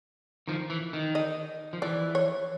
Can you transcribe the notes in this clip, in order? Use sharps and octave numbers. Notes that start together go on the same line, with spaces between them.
D#3 F3
E3
D#3
D#5
F3
E3 D5
C#5